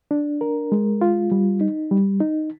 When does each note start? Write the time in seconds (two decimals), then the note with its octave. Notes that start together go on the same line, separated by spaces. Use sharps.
0.11 D4
0.41 A#4
0.72 G#3
1.01 F4
1.32 G3
1.61 D#4
1.91 G3
2.20 D#4